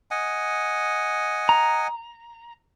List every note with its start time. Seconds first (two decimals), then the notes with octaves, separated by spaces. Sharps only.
0.11 D#5 F#5 G#5
1.49 A#5